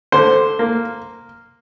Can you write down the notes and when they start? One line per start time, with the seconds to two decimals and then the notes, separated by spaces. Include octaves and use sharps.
0.12 D3 C5
0.59 A#3